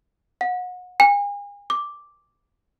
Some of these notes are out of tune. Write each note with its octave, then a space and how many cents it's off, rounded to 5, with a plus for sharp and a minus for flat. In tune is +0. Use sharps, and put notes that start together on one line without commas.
F#5 -30
G#5 -40
D6 +0